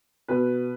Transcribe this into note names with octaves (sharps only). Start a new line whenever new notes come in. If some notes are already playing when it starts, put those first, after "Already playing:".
B2 B4